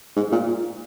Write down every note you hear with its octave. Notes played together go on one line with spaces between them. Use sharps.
G#2
A#2